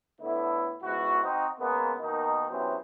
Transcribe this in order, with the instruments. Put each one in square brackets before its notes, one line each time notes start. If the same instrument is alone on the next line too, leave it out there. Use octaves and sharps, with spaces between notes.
[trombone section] A2 D3 B3 E4
C#2 G#2 B2 E4 F#4
C4 D#4 F#4
C#3 G#3 A#3 B3
B2 D#3 A#3 D#4
C3 E3 F#3 B3 C#4 C5